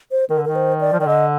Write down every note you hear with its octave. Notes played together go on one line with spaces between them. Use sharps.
C5
D#3 A#4
D3
D#3 A#4
C5
D5
F3
D#3 D5
D3 D#5